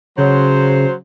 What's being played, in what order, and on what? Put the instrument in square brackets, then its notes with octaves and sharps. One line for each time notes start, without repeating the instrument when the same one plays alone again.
[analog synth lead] C#3 [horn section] F#3 C5